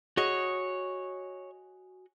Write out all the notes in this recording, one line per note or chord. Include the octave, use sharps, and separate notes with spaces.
F#4 G#4 C#5 D#5